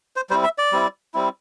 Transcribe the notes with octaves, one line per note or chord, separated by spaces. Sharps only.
C5
G3 C4 E4 C5
E5
D5
G3 C4 E4
G3 C4 E4